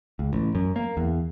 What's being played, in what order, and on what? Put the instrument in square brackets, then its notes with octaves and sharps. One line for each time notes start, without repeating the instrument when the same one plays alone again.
[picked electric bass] C#2
A1
F#2
A#3
E2